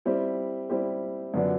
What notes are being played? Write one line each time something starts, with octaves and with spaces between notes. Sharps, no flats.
G3 C4 E4 G4
G3 C4 E4 G4
F#2 D3 F#3 B3 D4